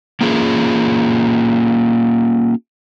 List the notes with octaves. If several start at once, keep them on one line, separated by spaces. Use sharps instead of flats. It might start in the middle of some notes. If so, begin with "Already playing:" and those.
A#3 C#4 F4 G#4